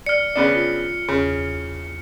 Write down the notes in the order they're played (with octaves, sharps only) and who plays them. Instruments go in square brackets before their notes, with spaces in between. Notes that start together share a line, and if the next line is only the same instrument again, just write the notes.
[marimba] D5 [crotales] F6 C#7
[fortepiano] C#3 B3 D4
[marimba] F4
[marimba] E2 [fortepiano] C#3